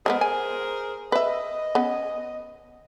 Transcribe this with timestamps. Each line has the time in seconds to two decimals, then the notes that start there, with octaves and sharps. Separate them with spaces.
0.06 G#3 A3 B3 G#4 A#4 C5
0.21 G#5
1.12 B4 D#5 E5
1.75 B3 C#4